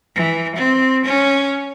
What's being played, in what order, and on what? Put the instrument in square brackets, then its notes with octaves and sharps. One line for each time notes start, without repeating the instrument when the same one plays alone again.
[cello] E3
C4
C#4